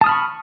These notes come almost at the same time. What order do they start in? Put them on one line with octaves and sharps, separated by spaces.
A5 D#6 F6 B5 C#6